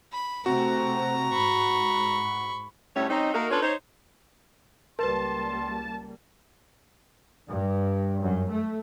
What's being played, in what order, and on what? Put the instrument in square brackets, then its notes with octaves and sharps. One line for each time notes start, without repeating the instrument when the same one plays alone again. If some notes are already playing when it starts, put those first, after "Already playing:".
[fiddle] B5
[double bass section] C3 A3 C4 [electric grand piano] F#4 [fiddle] A#5
[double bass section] G#2 [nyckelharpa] B5 C#6
[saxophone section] D2 A2 G3 A3 C#4 C#5
G3 C4 C#4 D#4
A3 A#3 D#4 F#4 A#4
C#4 D4 F4 A4 B4 C#5
D#4 C5 C#5
[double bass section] C#2 G3 A#3 [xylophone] A#4 B4 [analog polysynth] A5 [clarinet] C6
[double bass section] G2
F#2
A3